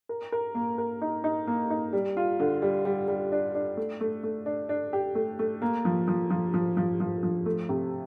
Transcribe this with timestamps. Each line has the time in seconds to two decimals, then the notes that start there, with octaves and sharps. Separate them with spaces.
0.09 A#4
0.32 A#4
0.55 A#3
0.78 A#4
1.02 D#4
1.24 D#4
1.47 A#3
1.70 D#4
1.93 G3
2.17 F4
2.40 D3
2.62 G3
2.85 G3
3.08 G3
3.32 D4
3.55 D4
3.77 A3
4.01 A3
4.23 A3
4.46 D4
4.69 D4
4.93 G4
5.15 A3
5.39 A3
5.62 A#3
5.85 F3
6.08 F3
6.30 F3
6.54 F3
6.77 F3
7.00 F3
7.23 F3
7.46 A3
7.69 C3